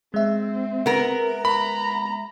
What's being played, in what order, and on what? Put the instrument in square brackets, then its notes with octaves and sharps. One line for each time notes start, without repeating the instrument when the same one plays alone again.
[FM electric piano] G#3 E5 [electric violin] C4
[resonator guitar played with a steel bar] B3 A#4
[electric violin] A#5 [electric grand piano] B5